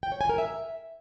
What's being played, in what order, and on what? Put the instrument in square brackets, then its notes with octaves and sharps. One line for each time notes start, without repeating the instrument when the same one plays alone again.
[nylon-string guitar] G5
C#5
G#5
A#4
E5